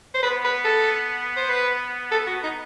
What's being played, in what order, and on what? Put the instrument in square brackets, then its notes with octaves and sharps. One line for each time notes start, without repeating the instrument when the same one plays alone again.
[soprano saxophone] C5
[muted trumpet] B3 [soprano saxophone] B4
[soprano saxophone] B4
A4
C5
B4
A4
F#4
D#4